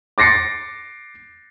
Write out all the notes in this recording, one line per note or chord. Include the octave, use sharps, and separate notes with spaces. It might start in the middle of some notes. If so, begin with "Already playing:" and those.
D6 A6 A#6 C7 C#7